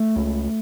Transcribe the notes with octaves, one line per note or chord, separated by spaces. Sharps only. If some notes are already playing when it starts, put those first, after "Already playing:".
Already playing: A3
C#2